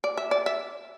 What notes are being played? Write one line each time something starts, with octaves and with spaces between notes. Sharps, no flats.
D5
E5
D5
E5